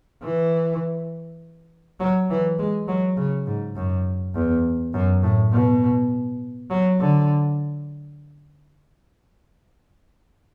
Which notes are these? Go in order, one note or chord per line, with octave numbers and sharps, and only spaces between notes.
E3
F#3
E3
G#3
F#3
C#3
G#2
F#2
E2
F#2
A2
B2
F#3
D3